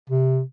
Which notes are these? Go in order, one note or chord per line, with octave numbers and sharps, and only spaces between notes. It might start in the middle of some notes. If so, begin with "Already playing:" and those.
C3